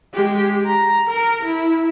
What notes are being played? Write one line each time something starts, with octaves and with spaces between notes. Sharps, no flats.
G#3 G4
A#5
A#4
E4